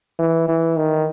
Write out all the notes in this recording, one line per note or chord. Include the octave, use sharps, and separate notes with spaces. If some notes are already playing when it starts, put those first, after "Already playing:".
E3
E3
D#3